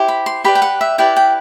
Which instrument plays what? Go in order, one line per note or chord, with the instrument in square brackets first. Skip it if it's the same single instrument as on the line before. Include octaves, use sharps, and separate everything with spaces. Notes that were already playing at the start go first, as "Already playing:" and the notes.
Already playing: [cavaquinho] E4 G4 C5
B5
C6
G4 B4 D5 B5
G5
F#5
E5
E4 G4 B4 D5 G5
G5